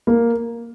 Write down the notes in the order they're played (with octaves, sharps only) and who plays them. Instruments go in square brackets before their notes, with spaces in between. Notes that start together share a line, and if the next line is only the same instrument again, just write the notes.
[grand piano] A#3